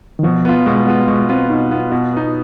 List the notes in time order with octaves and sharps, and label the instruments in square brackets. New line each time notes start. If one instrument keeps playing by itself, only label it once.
[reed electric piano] D#3
[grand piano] B2 [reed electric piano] F3
[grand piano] B3 F4
[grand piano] B2 [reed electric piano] G#3
[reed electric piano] B3
[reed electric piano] G#3 [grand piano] B3 F4
[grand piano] B2 [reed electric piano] G#3
[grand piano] B3 F4 [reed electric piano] C4
[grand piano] B2 [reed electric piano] D#4
[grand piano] B3 F4
[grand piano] B2 [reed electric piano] F4
[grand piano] B3 D#4